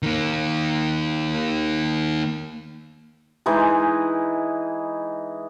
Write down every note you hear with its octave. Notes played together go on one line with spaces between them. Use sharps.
D#3 A#3
E3 G#3 D#4 G#4